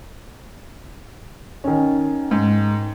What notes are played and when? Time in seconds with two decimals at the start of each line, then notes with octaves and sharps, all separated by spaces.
1.64 D#3 C#4
2.31 G#2